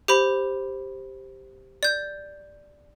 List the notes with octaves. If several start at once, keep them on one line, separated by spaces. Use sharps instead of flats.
G4 C5 B5
D5 G6